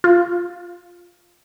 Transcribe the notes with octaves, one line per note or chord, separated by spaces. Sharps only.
F4